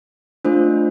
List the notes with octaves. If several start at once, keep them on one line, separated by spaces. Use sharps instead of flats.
A3 D4 F4 C5